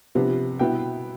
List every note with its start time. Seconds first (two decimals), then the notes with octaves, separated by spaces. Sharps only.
0.15 C3 F3 B3 D4
0.59 B2 B3 E4 G5